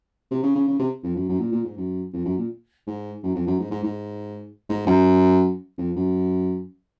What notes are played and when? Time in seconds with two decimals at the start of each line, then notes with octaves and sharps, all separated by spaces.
0.31 C3
0.43 C#3
0.56 C#3
0.68 C#3
0.79 C3
1.04 F2
1.16 F#2
1.29 F#2
1.40 A#2
1.52 A#2
1.65 G#2
1.77 F#2
2.13 F2
2.25 F#2
2.38 A#2
2.87 G#2
3.23 F#2
3.35 F2
3.47 F#2
3.60 G#2
3.71 G#2
3.84 G#2
4.69 G#2
4.87 F#2
5.78 F2
5.96 F#2